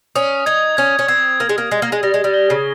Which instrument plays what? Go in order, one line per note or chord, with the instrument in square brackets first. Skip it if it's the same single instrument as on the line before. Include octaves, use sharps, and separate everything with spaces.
[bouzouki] C#4 [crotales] D#6
[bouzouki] D#4 [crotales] G#6
[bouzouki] C#4 [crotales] G#6
[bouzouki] C#4
[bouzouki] C4 [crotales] G#6
[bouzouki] A#3 [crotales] G#6
[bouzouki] G#3
A#3
[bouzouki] G#3 [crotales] G#6
[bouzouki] A#3
G#3
[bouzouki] G3 [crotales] A#6
[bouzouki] G#3
G3
[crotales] G7
[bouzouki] C#3